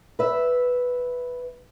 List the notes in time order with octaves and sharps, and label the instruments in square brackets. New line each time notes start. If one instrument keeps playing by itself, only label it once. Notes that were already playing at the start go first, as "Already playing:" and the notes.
[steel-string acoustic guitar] B4 E5